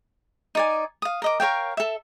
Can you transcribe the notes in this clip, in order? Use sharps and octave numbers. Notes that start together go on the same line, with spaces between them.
D#4 D5 G#5
F5 D#6
A#4 D#5 D6
A#4 C#5 F5 G5
A4 E5